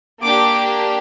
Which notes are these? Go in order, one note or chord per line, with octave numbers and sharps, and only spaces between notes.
A#3 D4 G4 D6